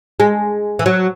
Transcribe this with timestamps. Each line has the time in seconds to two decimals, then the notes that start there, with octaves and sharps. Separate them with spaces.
0.20 G#3
0.79 E3
0.86 F#3